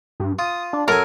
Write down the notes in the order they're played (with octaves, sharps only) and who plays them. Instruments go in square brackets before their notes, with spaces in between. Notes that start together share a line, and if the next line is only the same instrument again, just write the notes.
[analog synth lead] G2
[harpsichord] F4 [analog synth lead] D#6
[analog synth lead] D4
[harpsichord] F#2 G#5 [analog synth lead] A4 [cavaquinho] A#4